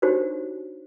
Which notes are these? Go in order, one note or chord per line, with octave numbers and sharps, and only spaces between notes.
D4 D#4 F#4 G4 C5 C#5